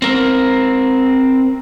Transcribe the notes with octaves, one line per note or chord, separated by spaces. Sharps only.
C4 A#4